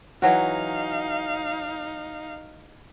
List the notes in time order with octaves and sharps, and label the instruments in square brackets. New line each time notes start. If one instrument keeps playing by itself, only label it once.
[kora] E3 F#3 F#4 [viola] D#4 F5